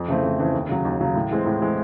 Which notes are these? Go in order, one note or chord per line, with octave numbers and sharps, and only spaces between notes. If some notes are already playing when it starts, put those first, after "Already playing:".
Already playing: F2
C#3 E3 A3 C4
F2
C#3 E3 A3 C4
D#2
C#3 F#3
D#2
C#3 F#3
A2
E3 G#3 C4
A2
E3 G#3 C4